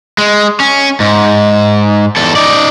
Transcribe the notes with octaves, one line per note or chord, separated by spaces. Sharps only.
G#3
C#4
G#2
E2 A4
D#4 D5